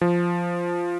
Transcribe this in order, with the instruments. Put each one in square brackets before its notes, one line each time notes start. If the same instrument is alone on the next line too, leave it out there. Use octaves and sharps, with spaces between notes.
[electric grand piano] F3